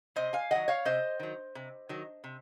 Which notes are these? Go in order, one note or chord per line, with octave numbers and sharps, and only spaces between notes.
C3 C5 D#5
F5 G#5
D#3 F#3 D#5 F#5
C#5 F5
C3 C5 D#5
D#3 F#3
C3
D#3 F#3
C3